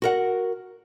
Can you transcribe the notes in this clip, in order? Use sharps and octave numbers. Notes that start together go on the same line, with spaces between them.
F#4 A#4 F#5